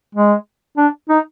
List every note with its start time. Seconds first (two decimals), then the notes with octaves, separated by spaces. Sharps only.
0.15 G#3
0.77 D4
1.09 D#4